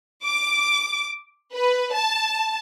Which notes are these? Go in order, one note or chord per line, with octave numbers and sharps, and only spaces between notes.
D6
B4
A5